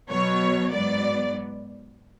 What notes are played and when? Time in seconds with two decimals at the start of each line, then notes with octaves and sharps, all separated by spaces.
0.10 B2 F#3 B3 C#5
0.73 G#2 F#3 B3 D5